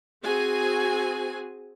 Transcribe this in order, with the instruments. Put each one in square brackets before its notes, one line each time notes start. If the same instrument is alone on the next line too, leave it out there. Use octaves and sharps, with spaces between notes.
[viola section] C4 F#4 G#4 G#5